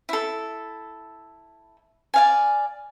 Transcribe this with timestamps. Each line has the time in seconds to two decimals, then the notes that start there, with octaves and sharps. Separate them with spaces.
0.09 E4 A4
2.14 D5 F5 G#5